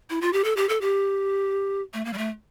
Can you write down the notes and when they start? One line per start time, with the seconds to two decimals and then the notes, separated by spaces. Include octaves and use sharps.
0.10 E4
0.21 F4
0.33 G4
0.44 A4
0.57 G4
0.69 A4
0.81 G4
1.94 A3
2.05 A#3
2.13 G3
2.18 A3